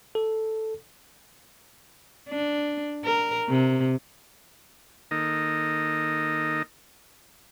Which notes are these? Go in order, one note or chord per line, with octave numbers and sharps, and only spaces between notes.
A4
D4
A#4
C3
D#3 A#3 D#4 A4 D#5